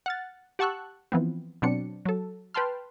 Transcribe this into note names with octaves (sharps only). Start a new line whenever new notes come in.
F#5 F6 A6
G4 F#5 A5 C#6 E6 F#6
E3 F3 B3 C4
B2 F#3 C4 D4 C#7
F#3 A4
B4 G5 A5 C6 F6